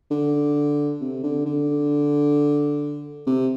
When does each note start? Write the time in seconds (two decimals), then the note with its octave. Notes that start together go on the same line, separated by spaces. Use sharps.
0.11 D3
1.01 C3
1.24 D3
1.46 D3
3.27 C3